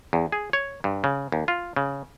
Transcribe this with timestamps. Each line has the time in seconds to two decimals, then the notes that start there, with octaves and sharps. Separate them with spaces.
0.13 E2
0.32 G#4
0.53 C#5
0.84 G2
1.04 C#3
1.32 D#2
1.48 F4
1.76 C#3